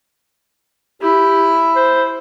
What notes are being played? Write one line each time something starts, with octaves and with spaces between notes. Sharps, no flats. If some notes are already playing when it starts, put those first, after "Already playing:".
E4 G4
C5